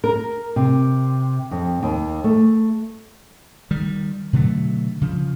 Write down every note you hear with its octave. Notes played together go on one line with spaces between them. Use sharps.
A#4
C3
F2
D#2
A3
D#3 G3
B2 D3 F#3 A3
C#3 F3